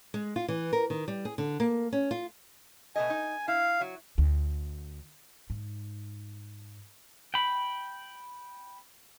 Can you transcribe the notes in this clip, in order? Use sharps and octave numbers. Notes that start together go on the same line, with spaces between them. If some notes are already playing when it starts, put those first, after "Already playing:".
G#3
F4
E3
A#4
D#3
G3
G#4
D3
A#3
C#4
F4
B2 A3 D#5 G#5
D#4
E4 F5
F#3
D2
G#2
G5 B5